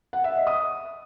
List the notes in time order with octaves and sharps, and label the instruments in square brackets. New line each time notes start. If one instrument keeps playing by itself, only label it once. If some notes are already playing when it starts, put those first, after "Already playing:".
[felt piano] F#5
E5
D#5
D#6